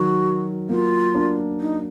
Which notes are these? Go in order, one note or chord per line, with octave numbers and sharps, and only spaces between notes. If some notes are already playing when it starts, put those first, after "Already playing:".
Already playing: D#3 F#3 F#4
F#3 A#3 F4
A#3 D4
D#4